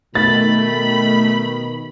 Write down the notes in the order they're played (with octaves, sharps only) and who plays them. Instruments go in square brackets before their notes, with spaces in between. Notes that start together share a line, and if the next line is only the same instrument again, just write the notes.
[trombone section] B2 D#3 [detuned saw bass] A3 [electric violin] B5 [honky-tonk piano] A6